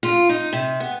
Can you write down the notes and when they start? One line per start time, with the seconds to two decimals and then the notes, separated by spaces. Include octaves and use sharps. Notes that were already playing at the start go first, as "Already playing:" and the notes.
0.03 F4
0.29 D#4
0.53 C3
0.80 B3